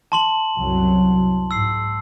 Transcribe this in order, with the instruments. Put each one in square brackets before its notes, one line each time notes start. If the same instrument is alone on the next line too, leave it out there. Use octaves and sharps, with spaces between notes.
[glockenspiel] A5 C6 F#7
[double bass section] C2 F#2 F#3
[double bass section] G#2 [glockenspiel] E6 C7